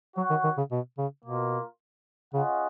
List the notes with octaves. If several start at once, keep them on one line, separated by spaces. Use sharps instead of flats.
F#3 F#4 C#5 F#5
D#3
D#3
C#3
B2
C#3
B2 A#3 F4 A#4
C#3 C#4 F4 G#4 D#5 F#5